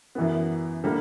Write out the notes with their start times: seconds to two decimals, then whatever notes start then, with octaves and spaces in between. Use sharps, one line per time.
0.15 F#2 E3 B3
0.84 D3 G3 A#3